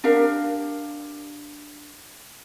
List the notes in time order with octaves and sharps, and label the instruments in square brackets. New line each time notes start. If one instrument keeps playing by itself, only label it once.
[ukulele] D4 G4 A#4 F5